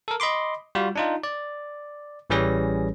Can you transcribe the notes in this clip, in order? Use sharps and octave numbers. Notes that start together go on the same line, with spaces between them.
A4 A#4
D#5 B5 C6 D6
G3 F4 F#4
D4 D#4 F4
D5
A1 E3 G3 C#4 G#4 A#6